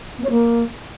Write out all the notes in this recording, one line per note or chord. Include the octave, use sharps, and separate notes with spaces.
B3
C#5
A#3